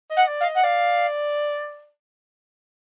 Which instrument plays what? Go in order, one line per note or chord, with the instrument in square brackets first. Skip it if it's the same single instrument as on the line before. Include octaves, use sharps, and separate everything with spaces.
[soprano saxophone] D#5
[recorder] F#5
[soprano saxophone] D5
[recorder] F5
[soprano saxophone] D#5
[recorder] F#5
[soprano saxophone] D5 [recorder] F5